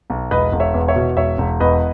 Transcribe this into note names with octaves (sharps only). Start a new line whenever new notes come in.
B1
E1 B4 D#5
E1
C#5 E5
E2
C#5 E5
B2
E1 C#5 E5
E1
E2 B4 D#5